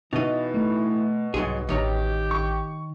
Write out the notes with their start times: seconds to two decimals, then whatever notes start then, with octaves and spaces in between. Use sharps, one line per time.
0.13 B2 E3 D#4 D#5 A6
0.54 A3
1.34 C2 G#2 F#3 G#4 C6
1.69 A1 D#3 G4 C#5 A#5
2.31 C#6